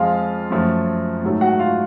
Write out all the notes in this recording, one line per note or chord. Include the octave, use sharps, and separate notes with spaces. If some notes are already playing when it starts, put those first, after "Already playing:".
Already playing: F2 F3 G#3 F4 F5
F#2 F3 A3
G#2 F#3 A3
F#4 F#5
F4 F5